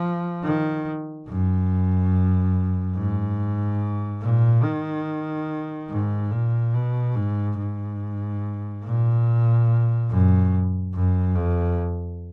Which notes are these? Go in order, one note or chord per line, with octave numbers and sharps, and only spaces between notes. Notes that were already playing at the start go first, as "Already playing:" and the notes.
Already playing: F3
D#3
F#2
G#2
A#2
D#3
G#2
A#2
B2
G#2
G#2
A#2
F#2
F#2
F2